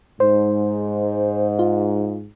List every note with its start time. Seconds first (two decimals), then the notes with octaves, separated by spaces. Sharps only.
0.20 G#2 C5
1.59 F4